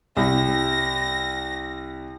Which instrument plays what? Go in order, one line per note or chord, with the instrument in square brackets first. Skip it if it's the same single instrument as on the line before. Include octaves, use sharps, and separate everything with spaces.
[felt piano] C2 [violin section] A#6